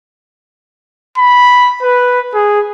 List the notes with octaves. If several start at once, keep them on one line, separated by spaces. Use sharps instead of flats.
B5
B4
G#4